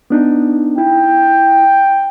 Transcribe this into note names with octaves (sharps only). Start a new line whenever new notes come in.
B3 D4 D#4
E4 G5